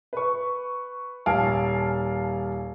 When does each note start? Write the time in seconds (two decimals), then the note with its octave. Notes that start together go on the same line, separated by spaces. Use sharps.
0.13 B4 C#6
1.26 D#1 F5 G#5 A5 D7